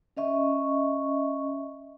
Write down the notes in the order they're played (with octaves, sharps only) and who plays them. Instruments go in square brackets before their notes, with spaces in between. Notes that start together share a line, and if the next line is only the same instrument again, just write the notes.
[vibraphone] C#4 D#5 E5 C#6